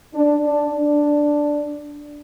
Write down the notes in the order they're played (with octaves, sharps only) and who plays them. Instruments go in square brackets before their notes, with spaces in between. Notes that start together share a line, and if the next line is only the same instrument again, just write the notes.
[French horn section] D4
D4
D4